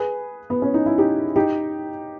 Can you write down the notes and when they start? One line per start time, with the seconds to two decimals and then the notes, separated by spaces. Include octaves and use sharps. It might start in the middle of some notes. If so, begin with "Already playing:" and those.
Already playing: G#4 B4
0.50 B3
0.62 C#4
0.74 D#4
0.86 E4
0.98 D#4 G4
1.36 D#4 G4